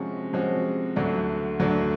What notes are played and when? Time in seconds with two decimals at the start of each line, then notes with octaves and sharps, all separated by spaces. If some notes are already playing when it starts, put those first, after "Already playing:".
Already playing: C3 F3 G#3 C#4 F#4
0.33 C3 F3 G#3 C#4 F#4
0.96 D2 D3 F#3 A3 D4
1.59 D2 D3 F#3 A3 D4